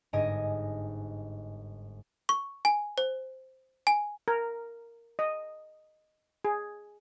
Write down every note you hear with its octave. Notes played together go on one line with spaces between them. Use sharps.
G1 G#2 D#5 G#5 D7 D#7
C#6
G#5
C5
G#5
A#4
D#5
G#4